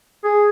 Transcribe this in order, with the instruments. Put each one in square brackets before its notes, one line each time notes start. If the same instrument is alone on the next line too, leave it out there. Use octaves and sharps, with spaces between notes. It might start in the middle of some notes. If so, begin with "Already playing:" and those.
[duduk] G#4